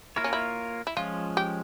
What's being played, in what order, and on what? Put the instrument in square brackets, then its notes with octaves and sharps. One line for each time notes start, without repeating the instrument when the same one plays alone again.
[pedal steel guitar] A#3 F4 A#4 C#5 [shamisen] E4
[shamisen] C#4
E4
E4
[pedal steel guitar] F3 G#3 C#4 [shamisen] F4
[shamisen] G4